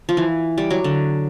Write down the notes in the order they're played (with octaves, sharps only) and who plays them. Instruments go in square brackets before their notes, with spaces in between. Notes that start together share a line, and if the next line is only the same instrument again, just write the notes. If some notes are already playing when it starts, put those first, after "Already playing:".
[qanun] F3
E3
G3
F#3
D3